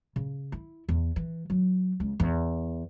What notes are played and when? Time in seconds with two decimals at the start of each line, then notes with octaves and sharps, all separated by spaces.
0.16 C#3
0.52 E4
0.89 E2
1.16 E3
1.50 F#3
2.00 C#2
2.20 E2